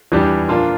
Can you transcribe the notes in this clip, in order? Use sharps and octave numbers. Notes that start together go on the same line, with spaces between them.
E2 E3 G3 D4 G4
A#2 F3 A#3 D4 F4